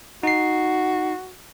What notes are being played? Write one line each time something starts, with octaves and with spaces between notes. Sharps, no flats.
D#4 F#4 C7